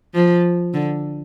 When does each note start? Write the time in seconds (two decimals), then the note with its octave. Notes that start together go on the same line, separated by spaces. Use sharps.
0.15 F3
0.74 D3